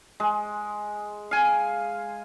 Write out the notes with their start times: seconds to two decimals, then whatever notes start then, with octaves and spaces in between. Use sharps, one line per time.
0.20 G#3
1.31 F5 G#5